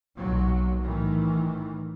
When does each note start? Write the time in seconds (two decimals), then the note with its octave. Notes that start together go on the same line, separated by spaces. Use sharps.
0.16 B1 A#2 F#3
0.82 A2 D#3 E3